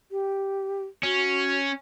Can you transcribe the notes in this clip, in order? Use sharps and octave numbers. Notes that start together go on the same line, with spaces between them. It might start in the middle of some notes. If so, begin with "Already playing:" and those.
G4
C#4 F#4